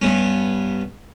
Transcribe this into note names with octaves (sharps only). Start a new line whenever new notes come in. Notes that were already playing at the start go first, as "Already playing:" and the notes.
G2 B3 C#4